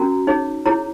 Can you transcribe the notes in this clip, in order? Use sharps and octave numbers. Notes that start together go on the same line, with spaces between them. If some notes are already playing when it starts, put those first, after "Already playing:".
Already playing: C#4 F#4 A#4 A#5
D#4 G#4 C#5
E4 G#4 C#5 A#5